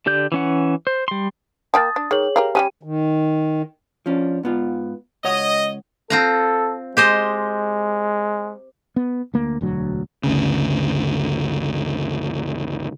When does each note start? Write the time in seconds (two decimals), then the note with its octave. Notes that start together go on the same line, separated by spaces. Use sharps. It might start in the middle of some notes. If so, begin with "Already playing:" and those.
0.06 D3 G4 D5 G6
0.32 E3 C#4 F#5
0.87 C5
1.08 G3 C6
1.74 A#3 G5 A5 D#6 A6
1.96 D4
2.11 D#3 G#4 C#5 F#7
2.36 G4 A#4 F5
2.55 G3 G#3 C#4 G4 G5 D#7
2.83 D#3
4.06 F3 C#4 D4
4.43 G#2 B3 F4
5.24 C#2 C#5 D#5 F#5
6.10 C4 F4 A4 A#5
6.97 G#3 G4 C5 D#5
8.96 B3
9.34 D2 A#3
9.61 E1 D2 F#3
10.24 G1 D2 C#3